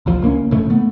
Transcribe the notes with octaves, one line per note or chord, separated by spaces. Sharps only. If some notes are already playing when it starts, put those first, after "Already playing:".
G#1 C#2 F3
C#2 A#3 C4 C#4
F1 G#2 C#3 A3
A3 B3